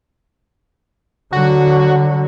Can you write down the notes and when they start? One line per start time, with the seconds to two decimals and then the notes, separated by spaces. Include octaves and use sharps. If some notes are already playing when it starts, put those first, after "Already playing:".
1.33 D3 F#3 F#4